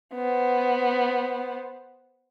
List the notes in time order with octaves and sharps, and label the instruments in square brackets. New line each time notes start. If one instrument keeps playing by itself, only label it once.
[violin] B3 C5